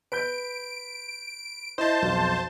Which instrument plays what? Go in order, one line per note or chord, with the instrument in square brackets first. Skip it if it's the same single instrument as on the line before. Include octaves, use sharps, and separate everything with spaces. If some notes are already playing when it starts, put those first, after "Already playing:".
[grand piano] B4 B5 G6 [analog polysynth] D7
[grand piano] E4 D#5 [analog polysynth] C5 A5
[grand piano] B1 F2